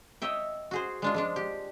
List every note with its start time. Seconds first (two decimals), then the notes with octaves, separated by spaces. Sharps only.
0.22 C#5 D#5 E5 G5
0.71 F#4 G#4 C5
1.02 G#3 D4 F4
1.14 F3 G#3 D4
1.36 G4